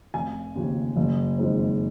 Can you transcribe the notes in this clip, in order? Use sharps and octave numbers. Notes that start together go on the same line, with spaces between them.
F1 G#5
D#2 C#3 F3
F#1
F2 D#3 G#3 C4